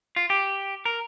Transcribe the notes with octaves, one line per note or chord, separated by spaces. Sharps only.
F4
G4
A#4